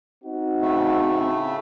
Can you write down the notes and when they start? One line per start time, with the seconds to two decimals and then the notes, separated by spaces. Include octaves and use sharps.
0.25 C4 D#4 F#4
0.61 A2 C#3 A3